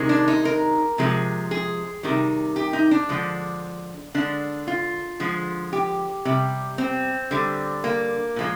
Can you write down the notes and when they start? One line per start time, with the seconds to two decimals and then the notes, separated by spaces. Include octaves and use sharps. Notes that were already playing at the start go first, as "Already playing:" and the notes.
Already playing: C3 D#3 G#3
0.09 D4
0.28 D#4
0.45 A#4
0.98 C3 F3 G#3
1.51 G#4
2.03 C3 D#3 G3
2.56 G4
2.73 D#4
2.91 D4
3.09 D3 F3 G#3
4.14 D3 G#3 D4
4.67 F4
5.20 D3 F3 G#3
5.73 G4
6.25 C3 G3
6.78 C4
7.31 D3 G3
7.84 A#3
8.36 A#2 F3 G#3